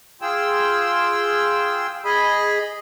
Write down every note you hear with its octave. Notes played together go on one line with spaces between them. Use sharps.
F4 G#4 G5 E6
G#4 D#5 B5